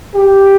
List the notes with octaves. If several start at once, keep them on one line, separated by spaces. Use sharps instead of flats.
G4